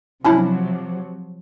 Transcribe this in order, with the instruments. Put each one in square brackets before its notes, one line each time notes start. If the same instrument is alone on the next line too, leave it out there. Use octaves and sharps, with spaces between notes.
[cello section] C3 F3 F#3 [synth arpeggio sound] C#4 D4 E4